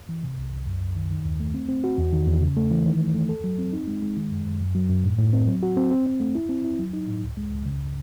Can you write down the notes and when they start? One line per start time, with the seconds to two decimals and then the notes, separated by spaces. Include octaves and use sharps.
0.09 E3
0.23 C3
0.38 C2
0.53 C2
0.67 F#2
0.81 F#2
0.96 D#3
1.10 D#3
1.25 D#2
1.40 A3
1.54 C4
1.69 C4
1.84 F#4
1.98 E2
2.13 D#3
2.27 E2
2.41 C#3
2.57 A3
2.71 E3
2.86 D#3
3.00 A3
3.14 A3
3.29 A4
3.44 F#3
3.58 C4
3.73 D#4
3.87 G#3
4.02 G#3
4.17 D#3
4.31 F#2
4.46 F#2
4.60 F#2
4.75 F#3
4.89 F#2
5.04 A2
5.19 A2
5.33 C4
5.47 F#3
5.63 F#4
5.77 C4
5.91 C4
6.06 C4
6.20 A3
6.35 E4
6.49 C4
6.64 E4
6.79 F#3
6.93 D#4
7.08 A2
7.23 C#2
7.37 G#3
7.52 C#2
7.66 C#3